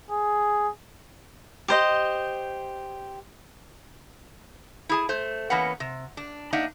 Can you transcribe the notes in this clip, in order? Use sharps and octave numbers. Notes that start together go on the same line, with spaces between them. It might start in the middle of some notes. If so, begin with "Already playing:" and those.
G#4
G4 C5 D#5
E4 G#4 A5
A3 C5
E3 A#3 B3 C#4 B4 F#5
C3
D4
A#3 D4 D#4 E5 F#5